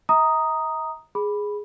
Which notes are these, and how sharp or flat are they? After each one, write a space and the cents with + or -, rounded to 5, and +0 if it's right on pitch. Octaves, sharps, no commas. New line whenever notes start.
E5 -45 A#5 +0 D#6 +0
G#4 +0 B5 +0